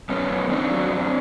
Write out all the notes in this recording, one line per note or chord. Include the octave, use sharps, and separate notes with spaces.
F#2 B3 C#4
F#2
D#3 C4 D4
F#3
F#2